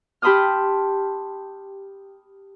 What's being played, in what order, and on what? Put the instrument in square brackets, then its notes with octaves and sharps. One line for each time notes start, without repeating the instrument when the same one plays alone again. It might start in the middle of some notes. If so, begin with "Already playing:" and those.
[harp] G4 A5 B5 C6 D#6 F6